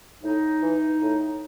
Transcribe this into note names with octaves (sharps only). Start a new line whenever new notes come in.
A2 D#4
E3
A2